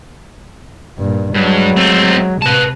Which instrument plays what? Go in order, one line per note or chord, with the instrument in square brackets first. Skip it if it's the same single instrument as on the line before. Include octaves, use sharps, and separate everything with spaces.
[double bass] G2 A#2
[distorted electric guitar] G2 [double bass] F#3 G#3
[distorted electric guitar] A3 C4
[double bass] C3 [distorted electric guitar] B4 A5